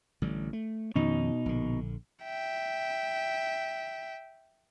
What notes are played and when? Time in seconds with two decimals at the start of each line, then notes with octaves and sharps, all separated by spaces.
0.22 A1 D3 G3
0.53 A3
0.96 F2 B2 D#3 C#4 D#4
1.46 A#1 D3
2.24 E5 G5